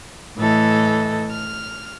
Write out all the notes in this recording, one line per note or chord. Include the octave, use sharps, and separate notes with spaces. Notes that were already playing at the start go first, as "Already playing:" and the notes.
A2 E3 A4 D#5
F6